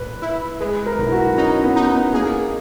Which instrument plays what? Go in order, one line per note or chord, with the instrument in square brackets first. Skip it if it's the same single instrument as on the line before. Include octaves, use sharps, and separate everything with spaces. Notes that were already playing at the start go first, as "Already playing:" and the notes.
Already playing: [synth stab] A#2 [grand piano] B4
[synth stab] E4
[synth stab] G#3 [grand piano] B4
[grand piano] A#4
[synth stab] B1
[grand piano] E4
F#4
[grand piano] C#4 [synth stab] D#4
[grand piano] B3
[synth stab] D#4
[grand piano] B3
[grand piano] A#3 [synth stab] G#4